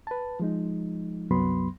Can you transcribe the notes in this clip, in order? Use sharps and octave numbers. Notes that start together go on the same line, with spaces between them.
B4 A5
F3 G#3 D#4
C2 F#2 F#3 B3 B5 C6